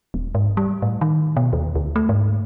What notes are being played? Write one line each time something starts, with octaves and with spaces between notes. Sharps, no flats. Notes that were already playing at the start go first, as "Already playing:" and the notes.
D#1
G#2
G3
A2
D#3
B2
D#2
D2
A3
G#2